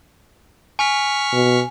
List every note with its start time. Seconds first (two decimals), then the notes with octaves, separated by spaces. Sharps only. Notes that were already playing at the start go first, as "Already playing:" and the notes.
0.79 G#5 C#6 F6 B6
1.33 B2